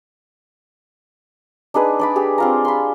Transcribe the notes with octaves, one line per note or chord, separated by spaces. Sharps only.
D4 D#4 G#4 B4
D4 D5 B5
G4 G#4
C4 F4 A#5
B5 C6